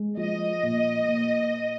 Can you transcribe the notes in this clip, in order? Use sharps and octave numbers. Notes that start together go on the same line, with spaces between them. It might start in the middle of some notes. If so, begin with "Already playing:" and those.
Already playing: G#3
F3 D#5
A#2
A#3